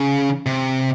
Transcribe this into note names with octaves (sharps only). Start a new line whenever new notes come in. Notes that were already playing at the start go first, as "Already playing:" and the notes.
Already playing: C#3
C3